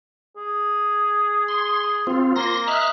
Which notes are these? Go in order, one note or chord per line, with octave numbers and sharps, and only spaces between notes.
G#4
C6
C4 F4
A#3 C6 A#6
D#5 E5 F6 F#6